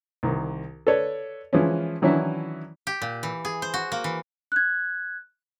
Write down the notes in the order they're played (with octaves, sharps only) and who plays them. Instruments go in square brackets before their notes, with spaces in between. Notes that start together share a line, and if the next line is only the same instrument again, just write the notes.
[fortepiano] C2 D#3
A4 B4 C#5 D5
E3 F3 G#3 C#4
D#3 E3 F#3 C#4 D4 E4
[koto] G4
A#2
E3
G#4
C5
F#4
A#3
E3
[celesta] F#6 G#6